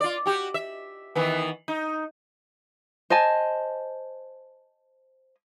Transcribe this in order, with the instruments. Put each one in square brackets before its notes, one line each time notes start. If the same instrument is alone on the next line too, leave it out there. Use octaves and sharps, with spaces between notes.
[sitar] F4 D5
F#4 G4
E5
D#3 E3 B3
D#4
[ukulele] C5 D#5 G#5 A5